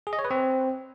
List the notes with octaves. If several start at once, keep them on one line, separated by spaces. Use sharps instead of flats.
G#4
D#5
C#5
B4
C4